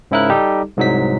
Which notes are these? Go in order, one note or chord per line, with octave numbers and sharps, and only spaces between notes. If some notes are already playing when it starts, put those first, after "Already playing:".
G#2 C#3 E4 A#4 F#6
G3 D#4 G4 A4
C2 G#2 F#3 D#4 B6